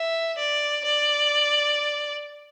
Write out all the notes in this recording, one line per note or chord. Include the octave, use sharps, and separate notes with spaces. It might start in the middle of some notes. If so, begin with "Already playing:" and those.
Already playing: E5
D5
D5